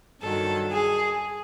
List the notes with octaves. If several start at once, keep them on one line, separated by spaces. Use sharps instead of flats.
G2 D#3 F#3 A4
G#4